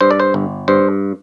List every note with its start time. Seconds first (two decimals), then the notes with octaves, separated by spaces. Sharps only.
0.01 G2 C5
0.11 D5
0.20 C5
0.34 G1
0.68 G2 C5